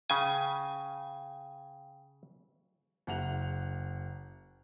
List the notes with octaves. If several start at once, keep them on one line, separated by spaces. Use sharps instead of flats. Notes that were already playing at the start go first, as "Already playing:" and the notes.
C#3 F5 G5 G#5
F#1 F#5 F7